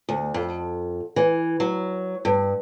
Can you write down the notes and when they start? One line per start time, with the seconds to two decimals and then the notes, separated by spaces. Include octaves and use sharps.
0.09 D2
0.34 F2
1.16 E3
1.60 F#3
2.25 G2